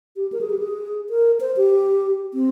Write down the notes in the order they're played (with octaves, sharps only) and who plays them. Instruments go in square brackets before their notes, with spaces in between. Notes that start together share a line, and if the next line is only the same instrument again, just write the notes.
[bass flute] G4
A#4
G#4
G4
G#4
A#4
C5
G4
C4